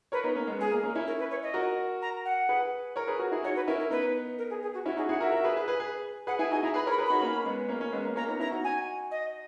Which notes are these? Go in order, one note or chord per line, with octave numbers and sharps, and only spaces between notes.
A#4 B4 C#5
B3 D#4
A#3 C#4
G#3 B3
G#3 G#4
A#3
A#3 C#4
C#4 E4
A#4
B4
C#5
D#5
F#4 A#4
A#5
F#5
G#4 B4
A#4 C#5
G#4 B4
F#4 A#4
E4 G#4
D#4 F#4 C#5
B4
C#4 E4 A#4
A#4
B3 D#4 B4
A#4
G#4
G#4
F#4
C#4 E4 F#4
D#4 F#4 G#4
E4 G#4 F#5
F#4 A#4 E5
F#4 A#4
G#4 B4
G#4 B4
G#4 B4
G#4 B4
G#4 B4 F#5
E4 G#4 G#5
D#4 F#4 G#5
E4 G#4 A#5
G#4 B4 B5
A#4 C#5 B5
G#4 B4
D#4 F#4 B5
A#3 C#4
G#3 B3
A#3 C#4
A#3 C#4
G#3 B3
A#3
A#3 C#4 A#5
B3 D#4
C#4 E4 A#5
D#4 F#4
G#5
D#5